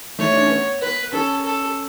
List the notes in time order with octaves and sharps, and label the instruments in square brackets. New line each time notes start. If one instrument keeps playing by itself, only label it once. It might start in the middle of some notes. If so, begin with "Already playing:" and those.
[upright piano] A3 [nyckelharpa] C#5
[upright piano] D4
C#4
B3
[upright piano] B3 [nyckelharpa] B4
[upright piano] C#4 [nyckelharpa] A4
[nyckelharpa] A4